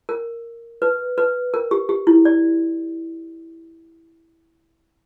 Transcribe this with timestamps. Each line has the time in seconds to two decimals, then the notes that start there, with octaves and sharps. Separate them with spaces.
0.09 A#4
0.82 B4
1.18 B4
1.54 A#4
1.71 G4
1.89 G4
2.07 E4
2.25 D5